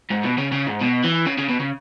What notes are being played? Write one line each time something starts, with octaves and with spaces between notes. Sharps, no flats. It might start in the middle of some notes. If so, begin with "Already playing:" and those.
G#2
B2
C#3
C#3
G#2
B2
E3
C#3
C#3
B2
C#3